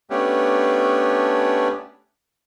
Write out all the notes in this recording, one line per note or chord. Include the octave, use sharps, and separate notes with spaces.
A3 B3 C#4 D4 G4